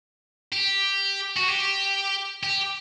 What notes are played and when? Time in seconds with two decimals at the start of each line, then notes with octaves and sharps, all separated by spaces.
0.52 G4
1.37 F#4
1.48 G4
2.43 G4